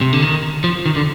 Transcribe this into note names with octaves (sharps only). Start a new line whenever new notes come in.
C3
D3
D#3
F3
D#3
D3